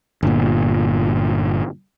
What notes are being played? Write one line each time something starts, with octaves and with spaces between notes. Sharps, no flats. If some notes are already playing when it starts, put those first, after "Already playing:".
G1 A#2